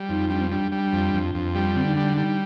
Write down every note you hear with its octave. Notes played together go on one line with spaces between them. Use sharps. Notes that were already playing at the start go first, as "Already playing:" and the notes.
Already playing: G3
F2 D#4
G3 D4
C4
G3 D4
G3
F2
F2
F2
G3
D3 C4
D#4
G3 D4
D4
G3 D#4